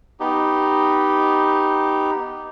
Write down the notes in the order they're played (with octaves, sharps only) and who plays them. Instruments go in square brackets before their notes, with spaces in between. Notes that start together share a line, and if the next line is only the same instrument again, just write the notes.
[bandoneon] B3 D#4 G4